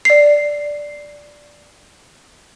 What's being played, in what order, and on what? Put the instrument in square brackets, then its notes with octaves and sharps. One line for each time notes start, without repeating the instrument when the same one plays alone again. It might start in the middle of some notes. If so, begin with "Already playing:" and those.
[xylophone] D5 C7